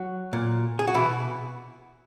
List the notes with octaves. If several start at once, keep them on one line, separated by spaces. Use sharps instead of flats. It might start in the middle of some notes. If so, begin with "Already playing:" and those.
Already playing: F#3 F#4
A#2
G#4
F#4
B2 E3 E4